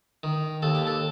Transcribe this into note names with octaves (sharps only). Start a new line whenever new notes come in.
D#3
D#2 A4
G4
A4